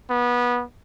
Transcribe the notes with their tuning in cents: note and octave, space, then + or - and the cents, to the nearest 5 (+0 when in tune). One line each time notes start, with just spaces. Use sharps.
B3 -20